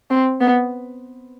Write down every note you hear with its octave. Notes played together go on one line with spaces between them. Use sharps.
C4
B3